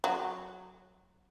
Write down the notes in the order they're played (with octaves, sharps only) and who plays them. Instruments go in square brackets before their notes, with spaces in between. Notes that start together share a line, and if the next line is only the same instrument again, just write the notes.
[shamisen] F#3